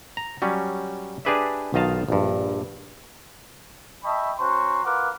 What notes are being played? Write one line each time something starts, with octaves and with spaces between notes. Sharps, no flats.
A#5
F#3 G3 C#4
D4 G4 G#4 B4 D5 E5
B1 D#3 F4 D#5 F5 A5
A#1 G2
D#5 E5 G5 A5 B5 C#6
C#4 F#4 C5 A#5 C6 C#6
F4 A#4 B4 F5 F#5 D6